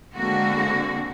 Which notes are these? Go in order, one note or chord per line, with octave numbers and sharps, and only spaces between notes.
D3 G#3 A#3 C4 F#4